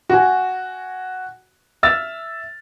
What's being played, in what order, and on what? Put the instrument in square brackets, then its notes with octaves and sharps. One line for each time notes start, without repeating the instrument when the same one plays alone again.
[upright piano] F#4 G#5
E5 E6 F6 A6